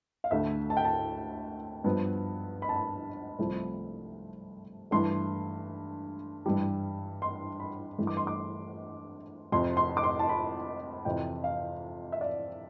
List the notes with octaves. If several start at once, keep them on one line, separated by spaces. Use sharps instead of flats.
F5
D2 D3 A3 E5
A5
G5
A5
G2 F3 B3
B5
A5
B5
C2 C3 F3 A3
G2 E3 A3 C6
G2 E3 G3
C6
B5
G2 E3 A3
D6
C6
D6
F2 C3 F3 C6
C6
D6
C6
A5
B5
F2 C3 E3 G5
F5
E5
D5